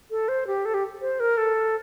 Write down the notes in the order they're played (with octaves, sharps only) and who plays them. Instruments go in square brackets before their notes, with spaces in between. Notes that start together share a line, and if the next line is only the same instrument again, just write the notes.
[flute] A4
C5
G4
A4
G4
C5
A#4
A4